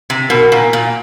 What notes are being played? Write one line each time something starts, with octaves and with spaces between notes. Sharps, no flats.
C3
B2 A#4
A#2
A#2